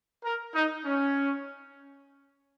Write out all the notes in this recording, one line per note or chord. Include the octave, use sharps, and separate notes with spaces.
A#4
D#4
C#4